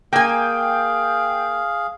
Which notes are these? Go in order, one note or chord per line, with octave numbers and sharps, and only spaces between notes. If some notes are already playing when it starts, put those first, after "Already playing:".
A#3 G#4 F5 G5 G#5